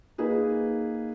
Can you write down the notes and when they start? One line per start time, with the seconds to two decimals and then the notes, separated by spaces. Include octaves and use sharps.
0.18 A#3 D#4 G#4 B4